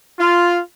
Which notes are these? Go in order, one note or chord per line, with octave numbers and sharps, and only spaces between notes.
F4